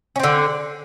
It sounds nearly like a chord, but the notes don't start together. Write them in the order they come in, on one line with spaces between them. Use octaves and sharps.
C#4 C4 D3